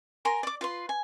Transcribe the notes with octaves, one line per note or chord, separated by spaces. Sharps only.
A#4 G#5 A#5 C6
D5 D6
F4 B4 C6
G#5